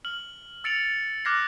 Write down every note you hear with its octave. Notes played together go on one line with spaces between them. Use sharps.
F6 F#7
E6 A6 C#7 D7 F7 F#7
D6 F6 F#6 G#6 A#6 C7